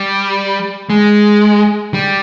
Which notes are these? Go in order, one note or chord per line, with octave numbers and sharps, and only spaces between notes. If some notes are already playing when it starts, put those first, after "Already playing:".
Already playing: G3
G#3
G3